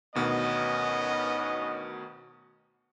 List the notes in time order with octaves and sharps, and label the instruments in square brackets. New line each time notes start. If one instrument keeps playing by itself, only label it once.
[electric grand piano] D2 B2 D#3 [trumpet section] B3 C#4 D#5